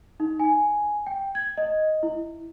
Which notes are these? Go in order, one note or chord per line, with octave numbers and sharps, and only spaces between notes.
D#4
G#5
G5
G#6
D#5
E4